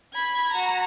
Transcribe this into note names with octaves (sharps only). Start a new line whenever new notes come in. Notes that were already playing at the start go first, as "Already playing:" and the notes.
B5 G#6
F#4 A#5